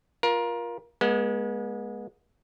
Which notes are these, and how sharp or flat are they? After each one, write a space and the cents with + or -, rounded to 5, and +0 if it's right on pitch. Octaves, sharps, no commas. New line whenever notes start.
F4 +0 A#4 +25
G#3 +0 B3 -40